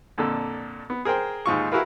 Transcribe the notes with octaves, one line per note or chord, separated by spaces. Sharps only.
F2 A#2 D3 A4
B3
G#4 A#4 C5 G5
D#2 G#2 F4 C#6
E4 F#4 G#4 A#4 B4 F5